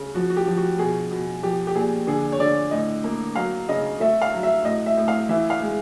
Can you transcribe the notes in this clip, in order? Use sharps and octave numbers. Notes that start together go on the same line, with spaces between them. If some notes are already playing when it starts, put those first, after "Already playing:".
Already playing: C#3
F3 F#4
F#4
G4
F3
F#4
B2 G#4
B2
F3 G4
G4
A#2 G#4
D3 G#4
C#5
D3 D5
A2 D#5
A#3
F#3 F5
C#3 D#5
A3 E5
F5
F#3
E5
A2 D#5
E5
A2
F5
E3 E5
F5
G#3